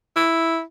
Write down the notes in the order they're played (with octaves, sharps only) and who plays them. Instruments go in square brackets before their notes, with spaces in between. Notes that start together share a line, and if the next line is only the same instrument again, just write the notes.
[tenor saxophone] E4